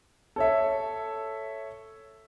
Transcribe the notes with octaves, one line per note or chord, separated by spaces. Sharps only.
A4 C#5 E5